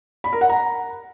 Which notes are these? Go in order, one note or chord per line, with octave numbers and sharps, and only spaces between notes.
B5
A#4
F#5
A#5